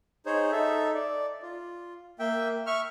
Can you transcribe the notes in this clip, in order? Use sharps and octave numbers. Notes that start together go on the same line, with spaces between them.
D#4 G#4 C5 C#5
D#4 A4 E5
D5
F4
A#3 E5 G5
E5 C#6 F6